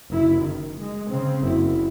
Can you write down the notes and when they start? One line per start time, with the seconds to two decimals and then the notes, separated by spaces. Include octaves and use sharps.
0.10 F#1 E4
0.42 D#3
0.78 G#3
1.10 C#3 C4
1.42 F#1 E4